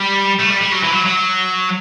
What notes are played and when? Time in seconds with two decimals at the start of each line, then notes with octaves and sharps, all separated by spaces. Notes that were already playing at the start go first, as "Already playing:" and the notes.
Already playing: G3
0.39 A3
0.50 G3
0.61 G3
0.72 F#3
0.83 E3
0.93 F#3
1.06 F#3